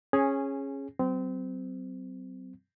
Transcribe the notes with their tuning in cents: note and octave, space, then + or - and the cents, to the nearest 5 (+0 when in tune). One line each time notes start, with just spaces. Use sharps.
C#4 -15 G#4 +0
F#3 +30 C4 -25